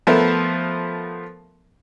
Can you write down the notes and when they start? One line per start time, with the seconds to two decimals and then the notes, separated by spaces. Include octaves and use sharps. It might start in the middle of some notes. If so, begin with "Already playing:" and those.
0.07 F3 A3 B3 A#4 E5